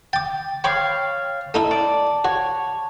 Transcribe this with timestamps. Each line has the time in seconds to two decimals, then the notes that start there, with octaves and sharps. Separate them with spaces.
0.13 G5 D6 A6
0.64 C#5 F5 G5 B5 D6
1.54 A3 D#4 E4 A5
1.71 D5
2.25 F#4 C#5